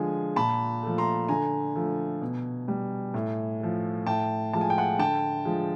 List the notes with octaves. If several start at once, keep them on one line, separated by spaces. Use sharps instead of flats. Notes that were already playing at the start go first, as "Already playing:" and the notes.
Already playing: D3 F3 G#3 G#5
A#2 A5 B5
F3 A3
A#5 C6
D3 G#5 A#5
F3 A3
B2
G3
A2
F3 A3
A2 G5 A5
F3 G#3 A5
G#5
G5
F#5 G#5
D3 G5 A5
F3 G#3